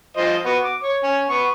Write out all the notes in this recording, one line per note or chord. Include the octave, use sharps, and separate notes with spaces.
F3 C5 D#5
B3 F#4
D6
C#5
C#4
B3 C#6